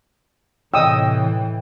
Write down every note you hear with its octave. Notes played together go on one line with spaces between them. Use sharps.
A2 C3 E3 C#5 D#5 G5 D#6 E6